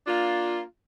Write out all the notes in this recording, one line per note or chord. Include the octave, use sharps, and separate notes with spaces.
A#3 D4 F4